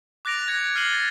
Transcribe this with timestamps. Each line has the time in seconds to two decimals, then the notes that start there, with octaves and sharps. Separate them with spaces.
0.25 D6 F#6 A6 A#6 D7 F7
0.47 F#6 G#6 C#7
0.75 F6 C7 D#7 F#7 G7
0.93 A6